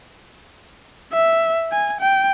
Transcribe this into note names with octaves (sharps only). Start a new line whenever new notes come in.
E5
G#5
G5